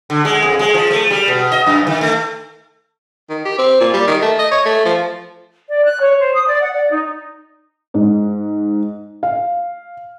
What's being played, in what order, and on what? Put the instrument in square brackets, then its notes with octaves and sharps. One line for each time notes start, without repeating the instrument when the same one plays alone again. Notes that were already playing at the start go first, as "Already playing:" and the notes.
[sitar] D3
G#3
F2
G#3
F3
A3
G3
B2
D#5
F#2
D#3
A3
[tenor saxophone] D#3
G4
C4
A#2
G3
D#3
A3
D#5
C#5
A3
F3
[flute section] D5
F#6
C#5
C5
D#6
D5
F#5
D5
D#4
[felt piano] G#2
F5